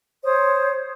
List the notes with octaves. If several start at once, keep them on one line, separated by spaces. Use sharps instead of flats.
C5 C#5 D#6